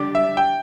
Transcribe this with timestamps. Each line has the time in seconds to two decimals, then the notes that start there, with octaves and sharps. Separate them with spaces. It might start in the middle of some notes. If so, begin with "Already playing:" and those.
Already playing: D3 G3 D4 G4 D6
0.15 E5
0.37 G5